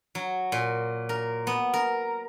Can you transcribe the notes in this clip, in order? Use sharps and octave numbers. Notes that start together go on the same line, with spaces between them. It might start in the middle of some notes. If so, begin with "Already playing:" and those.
F#3
A#2
A#4
B3
A#4